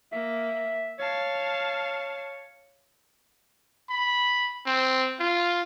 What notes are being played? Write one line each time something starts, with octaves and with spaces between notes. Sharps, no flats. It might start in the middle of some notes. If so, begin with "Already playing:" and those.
A#3 E5
C#5 F5 A5
B5
C4
F4